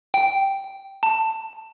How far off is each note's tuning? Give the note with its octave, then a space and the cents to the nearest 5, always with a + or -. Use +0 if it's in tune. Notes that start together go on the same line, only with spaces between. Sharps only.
G5 -5
A5 +15